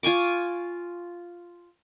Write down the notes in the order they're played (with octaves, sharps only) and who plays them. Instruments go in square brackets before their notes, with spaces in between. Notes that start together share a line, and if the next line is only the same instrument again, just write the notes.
[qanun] F4 G#5 C#6 D6